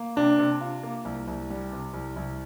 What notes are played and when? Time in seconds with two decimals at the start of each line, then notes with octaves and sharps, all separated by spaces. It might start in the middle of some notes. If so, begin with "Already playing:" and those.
Already playing: A#3
0.16 C3 D4
0.39 C3
0.61 F4
0.83 A#3
1.05 C2
1.28 C2
1.50 G3
1.72 C3
1.94 C2
2.16 C2